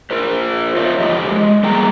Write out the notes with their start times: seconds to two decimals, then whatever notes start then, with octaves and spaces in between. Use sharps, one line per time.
0.11 F4 A#4 C5
0.76 F4 C5 C#5 D#5 E5
1.00 F2 F3 G4 D#5
1.31 G#3
1.63 G3 A#3 G#4 G5 A#5